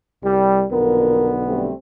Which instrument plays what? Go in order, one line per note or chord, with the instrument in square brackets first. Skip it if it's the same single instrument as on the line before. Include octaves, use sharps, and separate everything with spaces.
[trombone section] C2 G3
[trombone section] B1 D3 B3 [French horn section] F2 A#2 A#4
[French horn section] G3 A3 C4